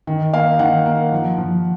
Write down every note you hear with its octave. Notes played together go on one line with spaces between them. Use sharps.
D#3
A#3 F5
D#3 F#5
A#3
F3
F3